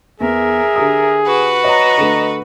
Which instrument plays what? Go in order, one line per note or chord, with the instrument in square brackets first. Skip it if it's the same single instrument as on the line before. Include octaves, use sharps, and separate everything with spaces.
[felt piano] E2 [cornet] G#4 [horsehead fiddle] A#4 E5
[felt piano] D3 G4 D#6
[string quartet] F#4 B4
[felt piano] C#5 [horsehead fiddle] D#5 A#5
[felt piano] D3 A3